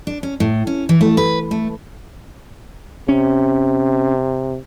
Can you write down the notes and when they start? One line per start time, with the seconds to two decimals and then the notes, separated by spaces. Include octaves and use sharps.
0.07 D4
0.23 C#4
0.40 A2
0.67 C#4
0.89 E3
1.01 A3
1.17 B4
1.51 A3
3.09 C3 C#4